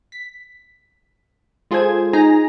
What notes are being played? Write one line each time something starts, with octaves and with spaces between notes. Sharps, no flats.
B6
G#3 F4 G#4 A4 C5 G#6
D#4 G#4 G#5 A#5 A#6